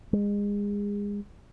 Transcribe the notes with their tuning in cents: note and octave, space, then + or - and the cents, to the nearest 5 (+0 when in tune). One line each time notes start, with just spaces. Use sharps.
G#3 -30